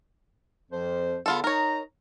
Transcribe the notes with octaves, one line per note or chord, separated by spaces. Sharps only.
F2 F3 C5
E2 D3 B3 F4 A4
D#4 A#4 C#5 A#5